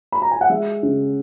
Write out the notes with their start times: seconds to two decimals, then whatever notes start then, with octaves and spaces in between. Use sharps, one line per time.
0.12 B5
0.22 A#5
0.31 G#5
0.41 F#5
0.49 G#3 E5
0.83 C#3